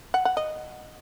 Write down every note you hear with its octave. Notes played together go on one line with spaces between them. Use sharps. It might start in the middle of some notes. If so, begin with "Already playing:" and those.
F#5
F#5
D#5